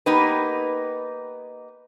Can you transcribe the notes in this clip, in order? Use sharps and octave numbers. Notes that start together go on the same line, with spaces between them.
A#3 B3 D#4 G4 B4